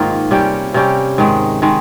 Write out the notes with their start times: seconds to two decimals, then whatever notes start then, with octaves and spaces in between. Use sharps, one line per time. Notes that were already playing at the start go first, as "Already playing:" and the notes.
Already playing: G#2 D#3 A#3 F4
0.31 C3 G3 C#4 G4
0.74 C3 G3 C#4 G4
1.18 G#2 D#3 G#3
1.62 D#3 G#3